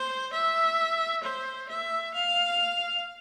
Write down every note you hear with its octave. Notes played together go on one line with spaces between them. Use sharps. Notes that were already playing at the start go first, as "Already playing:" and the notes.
Already playing: C5
E5
C5
E5
F5